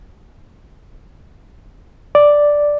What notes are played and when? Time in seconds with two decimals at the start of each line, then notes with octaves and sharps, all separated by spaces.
2.15 D5